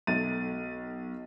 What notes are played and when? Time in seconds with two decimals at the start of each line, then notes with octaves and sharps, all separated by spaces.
0.07 B1 A4 A6 D#7